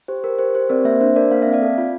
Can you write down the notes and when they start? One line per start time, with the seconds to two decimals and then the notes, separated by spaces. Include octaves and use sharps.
0.08 G4 C5
0.24 G4 A#4
0.39 G4 C5
0.55 G4 C5
0.69 C4 A#4 D5
0.85 A#3 C5 E5
1.01 D4 C5
1.16 D4 A#4 D5
1.31 A#3 F5
1.42 C4 E5
1.53 D5 F5
1.62 A4
1.78 F4